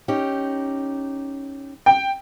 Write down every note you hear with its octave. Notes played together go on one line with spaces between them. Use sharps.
C#4 D#4 G4
G5